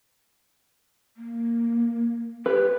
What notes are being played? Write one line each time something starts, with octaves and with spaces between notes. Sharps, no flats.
A#3
G4 B4